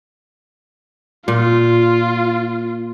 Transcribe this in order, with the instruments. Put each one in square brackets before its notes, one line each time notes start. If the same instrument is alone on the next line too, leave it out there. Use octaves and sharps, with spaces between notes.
[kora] A#2 [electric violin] F4